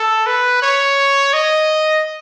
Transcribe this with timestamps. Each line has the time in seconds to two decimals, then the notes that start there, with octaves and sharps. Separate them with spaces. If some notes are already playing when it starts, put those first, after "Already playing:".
Already playing: A4
0.26 B4
0.62 C#5
1.34 D#5